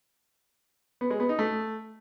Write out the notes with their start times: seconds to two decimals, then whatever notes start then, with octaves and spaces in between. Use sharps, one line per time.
1.01 B3
1.10 G#3
1.20 B3
1.29 D#4
1.39 A3